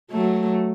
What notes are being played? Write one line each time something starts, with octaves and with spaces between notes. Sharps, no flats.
F#3 A3